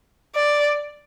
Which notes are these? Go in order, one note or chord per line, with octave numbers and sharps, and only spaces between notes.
D5